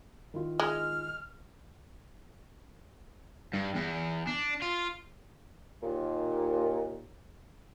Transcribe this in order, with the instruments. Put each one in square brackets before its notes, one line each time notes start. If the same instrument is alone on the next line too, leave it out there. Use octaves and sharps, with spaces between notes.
[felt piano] D#3 E4 F4
[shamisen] G#3 [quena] F6
[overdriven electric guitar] G2
E2
D4
F4
[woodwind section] D#2 A#2